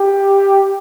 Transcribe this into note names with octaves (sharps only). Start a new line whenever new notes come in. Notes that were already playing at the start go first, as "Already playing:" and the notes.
Already playing: G4